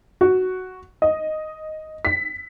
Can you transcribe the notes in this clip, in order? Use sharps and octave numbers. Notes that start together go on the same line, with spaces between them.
F#4
D#5
B6